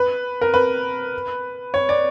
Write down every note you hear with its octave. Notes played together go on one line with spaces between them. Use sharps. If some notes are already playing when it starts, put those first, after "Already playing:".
Already playing: B4
A#4
B4
C#5
D5